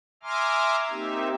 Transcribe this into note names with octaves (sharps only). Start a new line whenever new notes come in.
E5 G#5 A#5 C6 D6 F6
A#3 C4 D#4 G4 E5